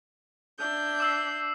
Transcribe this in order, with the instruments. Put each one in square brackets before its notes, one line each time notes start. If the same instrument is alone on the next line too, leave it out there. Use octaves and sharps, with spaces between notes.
[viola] D4 E5 [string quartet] G6
[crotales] D6 E6 C7